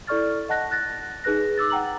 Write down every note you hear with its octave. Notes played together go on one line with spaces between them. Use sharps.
E4 A4 D5 C#6 F6 A6
D#5 F#5 A5 F#6 A#6
F#6 A6 A#6
D#4 G#4 B4 F#6 A#6
D6 E6 A6
F#5 G5 A#5 F#7